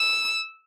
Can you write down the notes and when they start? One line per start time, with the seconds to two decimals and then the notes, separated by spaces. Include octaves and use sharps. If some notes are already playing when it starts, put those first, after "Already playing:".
Already playing: E6